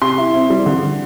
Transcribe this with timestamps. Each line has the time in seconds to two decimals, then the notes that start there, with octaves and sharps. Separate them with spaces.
0.02 C3 C6
0.18 E4
0.34 C4
0.50 G3
0.66 D3